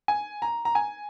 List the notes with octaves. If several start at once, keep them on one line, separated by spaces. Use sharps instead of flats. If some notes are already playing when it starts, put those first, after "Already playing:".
G#5
A#5
A#5
G#5